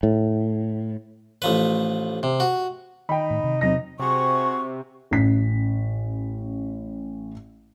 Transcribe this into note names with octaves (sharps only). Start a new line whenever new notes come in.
A2
A1 F3 B4
C3
F#4
D#3 D#4 G5 B5
A2
C3
E2 F#3 C4 D#4 A#6
C3 F#4 G#4 C5 C#6
A1 C#4 B6